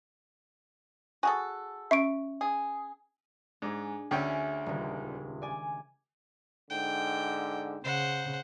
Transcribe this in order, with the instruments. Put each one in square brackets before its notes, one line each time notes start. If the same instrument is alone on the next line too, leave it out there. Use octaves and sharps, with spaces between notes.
[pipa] F#4 G#4 A4 [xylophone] G#5
[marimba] C#4 [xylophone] E5 C#6 D7
[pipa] G#4
[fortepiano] G#2 [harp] D4 G#4
[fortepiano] D2 C#4 G5 [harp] A3 G#4 E5
[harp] D#1 C#2
D5 G#5
[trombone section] G#2 D3 [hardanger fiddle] G5
[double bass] C#3 [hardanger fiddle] C5 F#5